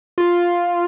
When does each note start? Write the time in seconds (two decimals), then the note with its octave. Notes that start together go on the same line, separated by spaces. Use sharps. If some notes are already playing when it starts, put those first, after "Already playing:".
0.18 F4